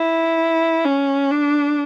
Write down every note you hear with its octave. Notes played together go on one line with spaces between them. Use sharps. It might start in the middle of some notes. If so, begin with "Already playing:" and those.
Already playing: E4
C#4
D4